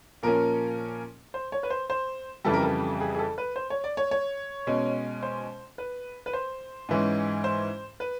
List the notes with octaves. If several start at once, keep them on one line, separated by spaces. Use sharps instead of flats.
A#2 F3 A#3 C#4 A#4
C5
C#5
B4
C5
C5
F2 C#3 E3 G3 A4
A#4
A4
G#4
G#4
A4
B4
C5
C#5
D5
C#5
C#5
B2 G#3 C#4
C5
B4
B4
C5
G#2 E3 G#3 C#4
C5
B4